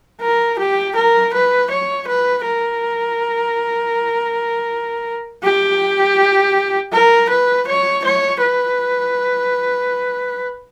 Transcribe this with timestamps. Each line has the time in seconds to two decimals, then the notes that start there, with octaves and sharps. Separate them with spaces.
0.22 A#4
0.59 G4
0.96 A#4
1.34 B4
1.70 C#5
2.08 B4
2.46 A#4
5.44 G4
6.93 A#4
7.30 B4
7.67 C#5
8.05 C#5
8.42 B4